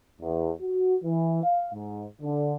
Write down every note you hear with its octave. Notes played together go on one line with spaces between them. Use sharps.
E2
F#4
E3
F5
G#2
D3